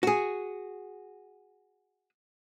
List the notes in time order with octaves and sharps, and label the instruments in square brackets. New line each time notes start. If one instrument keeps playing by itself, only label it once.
[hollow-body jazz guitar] F#4 G#4